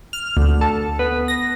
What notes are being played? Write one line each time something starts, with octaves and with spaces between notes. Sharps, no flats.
F6
D2
A4
B3
A#6